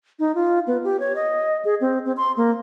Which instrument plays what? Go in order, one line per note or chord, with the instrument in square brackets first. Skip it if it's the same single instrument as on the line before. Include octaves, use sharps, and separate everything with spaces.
[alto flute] D#4
F4
B3
G4
C#5
D#5
G#4
C4
C4
C6
A#3